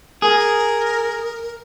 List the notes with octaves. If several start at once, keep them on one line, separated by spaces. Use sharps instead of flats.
G#4 A#4